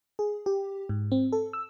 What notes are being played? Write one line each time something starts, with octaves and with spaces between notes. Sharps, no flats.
G#4
G4
G#2
C4
A4
E6